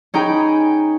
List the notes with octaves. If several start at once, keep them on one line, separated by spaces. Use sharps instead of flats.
C#4 D#4 G#4 G5 G#5 B5